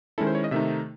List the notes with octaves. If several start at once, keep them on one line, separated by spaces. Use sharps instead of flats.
D#3 G#3 C#4 E4 A4
C5
C#5
D#5
C3 D#3 A3 D#4 E5